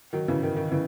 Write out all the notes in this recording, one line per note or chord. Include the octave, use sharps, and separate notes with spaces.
D#3 F#3
C#3 E3
D#3
D#3
C#3 E3